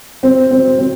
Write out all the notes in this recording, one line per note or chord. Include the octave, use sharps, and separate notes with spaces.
C4
C4
C4